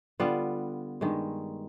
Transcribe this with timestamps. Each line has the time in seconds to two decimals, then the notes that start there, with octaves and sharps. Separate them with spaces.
0.20 D3 G3 B3 F4
1.01 G2 D#3 G#3